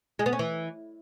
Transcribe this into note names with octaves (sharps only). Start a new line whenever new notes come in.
G#3
B3
C#4
E3